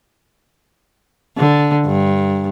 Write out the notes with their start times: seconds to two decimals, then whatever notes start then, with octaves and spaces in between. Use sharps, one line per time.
1.37 D3
1.86 G2